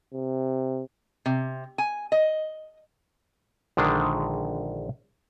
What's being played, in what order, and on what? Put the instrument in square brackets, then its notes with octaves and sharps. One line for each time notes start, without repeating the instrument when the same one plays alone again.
[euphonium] C3
[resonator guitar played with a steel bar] C3
G#5
D#5
[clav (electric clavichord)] A#1 D3 D#3 G#3 D4